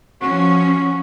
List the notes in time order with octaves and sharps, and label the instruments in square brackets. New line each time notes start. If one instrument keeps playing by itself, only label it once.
[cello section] F3 C#4 [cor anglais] F#4